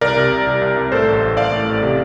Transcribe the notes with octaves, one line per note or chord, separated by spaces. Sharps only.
C2 A#4 D5
C3
C2
C2
C2
C2
A2 A4 C5
A1
A1
A1 D5 F5
A2
A1
C3